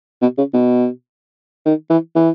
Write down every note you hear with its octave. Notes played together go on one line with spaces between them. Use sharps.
B2
C#3
B2
D#3
E3
E3